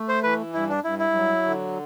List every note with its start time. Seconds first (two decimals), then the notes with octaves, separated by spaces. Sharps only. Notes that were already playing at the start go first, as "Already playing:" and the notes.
Already playing: A3
0.09 C5
0.23 E3 B4
0.53 G2 E4
0.69 D4
0.84 G2 E4
0.99 E4
1.15 F#3
1.45 D3